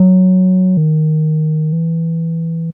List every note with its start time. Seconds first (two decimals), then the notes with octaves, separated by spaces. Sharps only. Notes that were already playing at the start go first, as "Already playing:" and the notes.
Already playing: F#3
0.77 D#3
1.73 E3